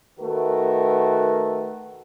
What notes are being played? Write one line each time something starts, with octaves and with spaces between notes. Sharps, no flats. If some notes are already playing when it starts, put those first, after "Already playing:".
D#3 A3 F#4 A#4 B4